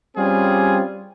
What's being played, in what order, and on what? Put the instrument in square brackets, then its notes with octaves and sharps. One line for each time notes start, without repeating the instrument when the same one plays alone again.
[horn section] G3 C4 C#4 F4 G#4